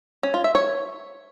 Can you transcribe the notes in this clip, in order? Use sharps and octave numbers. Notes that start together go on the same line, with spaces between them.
C#4
F4
E5
C#5